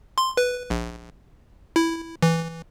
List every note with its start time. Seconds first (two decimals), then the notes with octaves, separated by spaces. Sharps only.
0.18 C6
0.37 B4
0.70 A#1
1.76 E4
2.23 E3